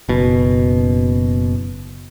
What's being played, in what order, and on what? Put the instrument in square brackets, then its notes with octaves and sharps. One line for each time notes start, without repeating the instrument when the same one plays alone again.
[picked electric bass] F#1 B2